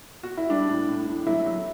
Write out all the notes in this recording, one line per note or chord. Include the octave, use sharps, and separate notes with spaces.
F#4
E4
G3 D4
A2
A2
A2
F#3 E4
F#3